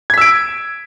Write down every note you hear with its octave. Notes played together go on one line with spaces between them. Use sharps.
E6 G#6 B6 D7